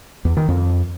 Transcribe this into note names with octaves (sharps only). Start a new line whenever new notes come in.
E2
D#3
F2